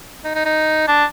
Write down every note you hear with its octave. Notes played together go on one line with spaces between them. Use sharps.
D#4
D#4
D#4
D4